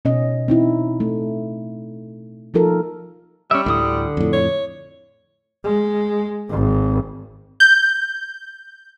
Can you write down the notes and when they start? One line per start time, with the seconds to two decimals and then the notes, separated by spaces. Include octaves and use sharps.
0.05 B2 C#4 D#5
0.48 C4 D#4 E4
1.00 A3
2.54 F3 D#4 F4 A4 A#4
3.51 G3 C#4 E5
3.66 D2 A2 D3 D#6
4.17 F2 A2
4.33 C#5
5.64 G#3
6.50 G#1
7.60 G6